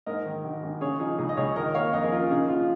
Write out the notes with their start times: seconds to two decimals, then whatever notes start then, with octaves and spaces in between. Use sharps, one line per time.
0.06 G#2 A#4 D#5
0.25 D#3
0.44 G#1
0.63 G#1
0.81 C#3 G#4 C#5
1.00 F3 D#4 G#4
1.18 C#2 D#4 G#4
1.29 D#5
1.37 C#2 G#4 C#5
1.56 D#3 A#4 D#5
1.74 A#3 C#5 F5
1.93 F2 A#4 D#5
2.03 G#4
2.12 C#4 F4 A#4
2.30 C#3 D#4 G#4
2.49 F3 F4